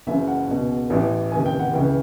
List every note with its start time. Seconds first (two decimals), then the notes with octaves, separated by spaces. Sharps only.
0.07 F#1 F#2 C#3 E3 E5
0.27 F#5
0.48 C#2 B2
0.90 A1 A2 E3
1.32 F1 D#2 C#3 E3 G#5
1.46 G5
1.59 F#5
1.73 C#2 C#3 E3 G5